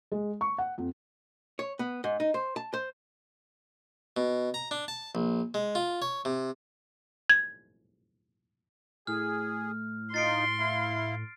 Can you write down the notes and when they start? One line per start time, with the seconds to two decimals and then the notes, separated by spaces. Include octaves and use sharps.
0.12 G#3
0.41 C#6
0.58 F#5
0.78 F2
1.59 C#5
1.79 B3
2.04 G#2
2.20 D#4
2.34 C5
2.56 A5
2.74 C5
4.17 B2
4.54 A#5
4.71 D4
4.88 A5
5.15 A#1
5.54 G#3
5.75 F4
6.02 C#5
6.25 C3
7.30 G#6
9.07 A2 G#4 F6
10.14 D#4 F4 C6 A6 C7 D7
10.59 E4 F5